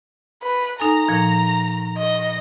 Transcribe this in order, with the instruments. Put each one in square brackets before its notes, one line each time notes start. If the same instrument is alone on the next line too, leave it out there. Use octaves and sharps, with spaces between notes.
[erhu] B4
[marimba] D#4 A4 G#5 [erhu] A#5
[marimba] A#2 F3
[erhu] D#5